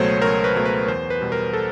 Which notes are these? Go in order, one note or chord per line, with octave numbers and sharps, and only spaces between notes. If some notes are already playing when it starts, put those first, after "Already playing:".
Already playing: C#2 B2 F#3 A3 C5 C#5
C#2 A#4
B4
B2 F#3 A3
B4
E2 C5
B4
B2 G3
A#4
A4